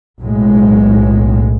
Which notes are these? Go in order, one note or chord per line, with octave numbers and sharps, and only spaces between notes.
B1 A2 G#3